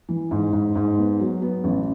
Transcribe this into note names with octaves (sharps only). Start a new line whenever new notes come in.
E3
G#2
G#2
G#2
B3
F#3
B3
A1